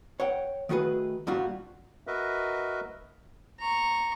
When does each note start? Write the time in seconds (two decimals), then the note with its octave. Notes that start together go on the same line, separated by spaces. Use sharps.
0.20 C#5 F#5 G5
0.69 D#3 A3 F#4 G#4 B4
1.27 G2 A#2 G3 F4 F#4
2.07 F#4 A#4 B4 D#5 E5
3.60 A#5 C#6